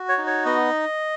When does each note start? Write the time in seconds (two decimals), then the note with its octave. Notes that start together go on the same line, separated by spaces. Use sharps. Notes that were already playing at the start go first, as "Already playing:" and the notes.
Already playing: F#4
0.09 C#5
0.18 D#4
0.27 C#5
0.46 B3 D#5